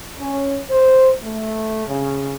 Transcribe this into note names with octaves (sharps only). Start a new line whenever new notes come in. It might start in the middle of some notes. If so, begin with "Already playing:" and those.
C#4
C5
A3
C#3